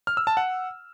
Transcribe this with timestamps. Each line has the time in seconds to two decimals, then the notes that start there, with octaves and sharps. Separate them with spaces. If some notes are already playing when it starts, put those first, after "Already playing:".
0.07 F6
0.17 E6
0.27 A5
0.37 F#5